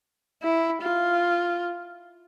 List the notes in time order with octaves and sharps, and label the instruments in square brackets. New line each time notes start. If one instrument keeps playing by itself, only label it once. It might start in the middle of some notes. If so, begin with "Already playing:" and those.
[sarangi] E4
F4